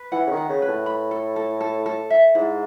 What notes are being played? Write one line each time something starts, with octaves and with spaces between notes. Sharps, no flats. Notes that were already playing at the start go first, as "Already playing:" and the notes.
Already playing: B4
E3 F#5
C#3
D#3
F#5
C#3
B4
A2
B5
A4
A4
A4
A4
E5
G#2 E4